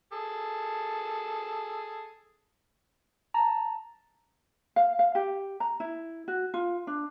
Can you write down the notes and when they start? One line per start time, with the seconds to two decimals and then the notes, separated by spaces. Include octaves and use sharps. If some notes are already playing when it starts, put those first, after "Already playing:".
0.13 G#4 A4
3.34 A5 A#5
4.76 F5
4.99 F5
5.15 G4
5.60 A#5
5.80 E4
6.28 F#4
6.54 F4
6.87 D4